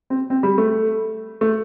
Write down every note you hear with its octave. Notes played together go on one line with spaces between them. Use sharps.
C4
C4
G3
A3
A3